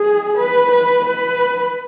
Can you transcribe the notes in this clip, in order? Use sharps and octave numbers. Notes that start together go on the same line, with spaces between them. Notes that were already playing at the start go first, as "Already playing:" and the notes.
Already playing: G#4
B4
B4
B4